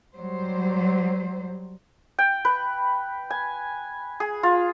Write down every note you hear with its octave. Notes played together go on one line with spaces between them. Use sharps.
F#3 G3 C5
G5
B4
G#5
G#4
F4